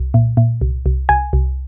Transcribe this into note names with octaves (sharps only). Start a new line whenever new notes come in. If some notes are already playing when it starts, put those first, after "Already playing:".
Already playing: C2
A#2
A#2
C2
C2
C2 G#5
C2